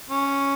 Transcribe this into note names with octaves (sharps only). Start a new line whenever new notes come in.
C#4